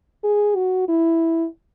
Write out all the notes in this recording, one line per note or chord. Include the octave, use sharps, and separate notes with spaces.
G#4
F#4
E4